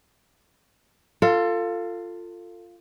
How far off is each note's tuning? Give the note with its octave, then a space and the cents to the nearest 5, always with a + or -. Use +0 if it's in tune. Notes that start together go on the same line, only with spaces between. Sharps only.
F4 +0 A4 +25